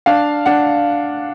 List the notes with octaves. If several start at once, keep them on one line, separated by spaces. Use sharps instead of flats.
D4 F5
D4 F#5